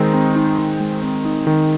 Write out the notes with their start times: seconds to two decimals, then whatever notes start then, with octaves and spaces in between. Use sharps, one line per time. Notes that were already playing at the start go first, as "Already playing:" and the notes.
Already playing: D#3 G#3 C4 D#4
0.14 C4
0.36 D#4
0.58 D#3
0.80 G#3
1.02 C4
1.25 D#4
1.47 D#3